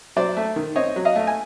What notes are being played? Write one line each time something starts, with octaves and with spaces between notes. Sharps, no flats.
F#3 C5 D5
A3
D#3
C4 C#5 D#5
F#3
D#5 F5
A3
G#5